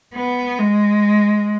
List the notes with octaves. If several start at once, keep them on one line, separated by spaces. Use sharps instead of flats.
B3
G#3